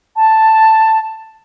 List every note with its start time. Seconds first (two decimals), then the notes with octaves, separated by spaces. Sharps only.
0.16 A5